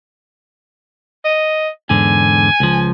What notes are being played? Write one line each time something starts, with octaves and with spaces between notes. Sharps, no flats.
D#5
E2 G#2 D3 G#5
C#2 F3